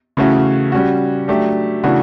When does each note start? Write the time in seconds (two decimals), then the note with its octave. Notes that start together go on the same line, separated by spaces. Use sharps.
0.17 C#3 E3 A3 C#4 F#4
0.72 G3 C#4 F#4
1.28 F#3 A3 D4 G4
1.83 C#3 E3 A3 D4 F#4